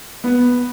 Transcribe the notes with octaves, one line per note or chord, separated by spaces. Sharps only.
B3